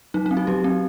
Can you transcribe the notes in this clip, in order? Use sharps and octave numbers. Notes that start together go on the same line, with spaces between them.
F#3 D#4
D#4
C4
F#4
F#3 G4
C4